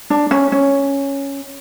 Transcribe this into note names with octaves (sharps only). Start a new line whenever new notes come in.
D4
C#4
C#4